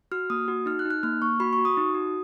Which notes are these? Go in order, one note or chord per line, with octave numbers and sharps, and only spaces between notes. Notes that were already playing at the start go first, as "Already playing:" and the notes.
F#4 F6
A#3 D#6
F#4
D#4 F6
F#6
D#4
F#6
A#3 F6
A#3 C#6
F#4 B5
C#6
F#4
D#6
D#4
F#4